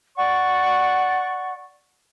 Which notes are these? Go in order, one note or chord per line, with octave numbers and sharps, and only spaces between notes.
D5 F#5 C#6